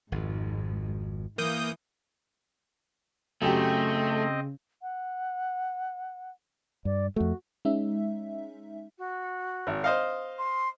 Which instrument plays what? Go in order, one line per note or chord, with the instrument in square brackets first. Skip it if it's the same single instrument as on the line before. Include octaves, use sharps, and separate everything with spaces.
[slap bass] G#1 F2 [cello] G#2
[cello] E3 [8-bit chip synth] A#3 D#6 G6
[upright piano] F#2 G4 [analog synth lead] C#3 [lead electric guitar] A3 [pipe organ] C4 D#5
[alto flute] F#5
[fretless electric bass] G2 [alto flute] D5
[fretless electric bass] F2 A3 [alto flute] F#4
[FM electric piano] G#3 C#4 D#4 E5
[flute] F#4
[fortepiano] G#1
C5 D#5 F5
[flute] C6